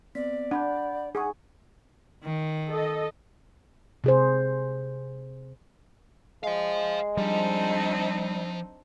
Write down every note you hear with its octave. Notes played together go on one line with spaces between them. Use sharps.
B3 C4 D5 B6
D4 F#5 B5 G6
D#4 G#4 F#5 G#5 C#6
D#3
A4 D#5
C3 G#4 C5
G#3 C5 F5
F3 G3 C4 D4 D#4